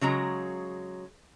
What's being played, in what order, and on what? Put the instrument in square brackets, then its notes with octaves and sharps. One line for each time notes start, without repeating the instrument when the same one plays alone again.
[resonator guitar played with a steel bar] C#3 F#3 G#3 A#5